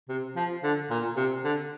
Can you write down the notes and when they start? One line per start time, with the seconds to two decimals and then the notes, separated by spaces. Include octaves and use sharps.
0.09 C3
0.36 F3
0.63 D3
0.90 A#2
1.16 C3
1.44 D3